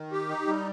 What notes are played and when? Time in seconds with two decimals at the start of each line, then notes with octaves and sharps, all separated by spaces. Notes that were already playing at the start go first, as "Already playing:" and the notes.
Already playing: D#3
0.12 G4
0.29 D#4
0.47 G3